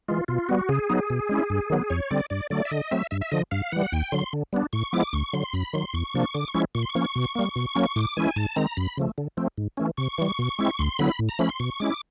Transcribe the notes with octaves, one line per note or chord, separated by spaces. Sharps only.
E3 G#3 F4
B2 F4
G3 B3 F#4
C#3 G#4
F#3 B3 D#4
B2
G#3 C#4 E4
G2
D#3 F#3 B3
F2 C#5
D3 G3 C4 D5
G2 D5
D3 F#3 A3 D5
E5
D3 D#5
F#3 A3 C4 E5
G2 E5
E5
D3 F3 D#5
G2 F5
E3 G3 F#5
D#2 G5
D3 F#3 C6
D3
G3 B3 D4
A2 C#6
F3 G#3 B3 E4 D6
D2 C#6
D3 F#3 C6
F#2 B5
D#3 F#3 C6
E2 C#6
C3 F3 A#3 D4
D3 D6
C#6
F3 G#3 C#4 E4
A#2 C#6
C6
C#6
F3 A#3 C#4
B2
G3 A#3
B2
F#3 A#3 C#4
A2 D6
E3 G#3 C#4 E4 G#5
G#2 A5
D#3 G#3 C4 A#5
F#2 B5
C#3 F3 A3
D3
F3 A3 C4
G#2
E3 A3 C#4
C3 C#6
E3 G3
B2
G#3 C4 E4
D2 C6
D3 F#3 B3 E4 B5
A2
A#5
F3 A3 C#4 B5
C6
B2 C#6
G#3 C#4 E4 D6